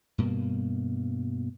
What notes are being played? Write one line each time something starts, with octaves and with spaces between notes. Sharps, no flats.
G2 B2 A#3